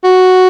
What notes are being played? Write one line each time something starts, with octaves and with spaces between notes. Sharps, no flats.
F#4